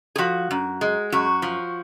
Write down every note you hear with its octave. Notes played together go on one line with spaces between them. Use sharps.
G#4
F3 F#4
F#2
G#3
F#2 F#4
F3